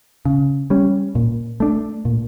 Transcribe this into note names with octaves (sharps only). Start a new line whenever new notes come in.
C#3
G3 C#4
A#2
A3 D4
A#2